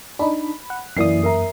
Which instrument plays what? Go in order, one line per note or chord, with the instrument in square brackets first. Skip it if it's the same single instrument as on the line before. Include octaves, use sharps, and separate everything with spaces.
[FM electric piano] D4 D#4 [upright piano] B5
[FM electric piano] F#5
[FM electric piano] F#2 A#3 D#6 [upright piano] E3 D5 C7
[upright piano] A#4 E5 A#5